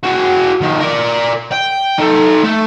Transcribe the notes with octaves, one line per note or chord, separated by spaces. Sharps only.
F#4 G#4
D#3 F3
A#4 D5
G5
D#4 A4
A3